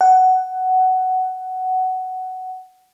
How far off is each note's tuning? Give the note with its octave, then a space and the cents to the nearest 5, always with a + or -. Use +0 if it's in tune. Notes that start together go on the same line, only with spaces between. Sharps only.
F#5 +10